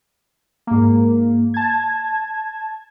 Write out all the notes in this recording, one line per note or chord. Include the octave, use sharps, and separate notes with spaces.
G#2 A#3
A5 G#6